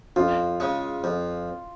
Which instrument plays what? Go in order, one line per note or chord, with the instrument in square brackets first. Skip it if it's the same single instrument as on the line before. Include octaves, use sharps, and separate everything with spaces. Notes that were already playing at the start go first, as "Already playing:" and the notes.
[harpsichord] F2 [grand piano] F4
[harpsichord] C#3 G#3
F2